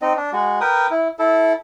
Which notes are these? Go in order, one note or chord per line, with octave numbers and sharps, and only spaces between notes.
C4 D#4 D#5
D4
G#3 F#4
A#4 B4 G5 D#6
E4
E4 A4